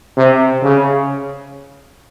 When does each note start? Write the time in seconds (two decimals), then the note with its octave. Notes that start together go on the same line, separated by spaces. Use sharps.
0.17 C3
0.63 C#3